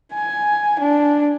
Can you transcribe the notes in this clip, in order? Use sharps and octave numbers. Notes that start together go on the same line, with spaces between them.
G#5
D4